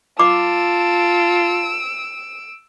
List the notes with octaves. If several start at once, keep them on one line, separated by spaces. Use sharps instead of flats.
F4 A5 D6 E6 D7